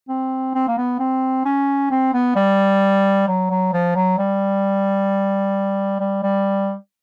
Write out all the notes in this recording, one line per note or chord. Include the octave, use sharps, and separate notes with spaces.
C4
C4
A#3
B3
C4
C#4
C4
B3
G3
F#3
F#3
F3
F#3
G3
G3
G3